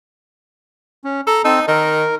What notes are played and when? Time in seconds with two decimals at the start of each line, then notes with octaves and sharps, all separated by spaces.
1.04 C#4
1.27 A4 A#5
1.45 C4 D#4 A5 E6
1.68 D#3 A#4